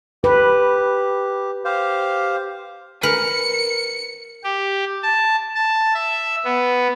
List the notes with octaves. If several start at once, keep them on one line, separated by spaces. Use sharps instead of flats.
G4 B4
G4 C5 F5
A#4 B4 C#7
G4
A5
A5
E5
B3